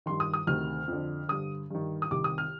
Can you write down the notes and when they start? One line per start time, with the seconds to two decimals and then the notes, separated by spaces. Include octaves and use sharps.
0.06 G2 D#3 C6
0.20 D#6
0.34 D#6
0.47 D2 C3 D#3 F6
0.88 F2 D3
1.28 G2 D3 D#6
1.71 G2 D#3
2.02 D#6
2.11 C2 C3 D#3 D6
2.24 D#6
2.38 F6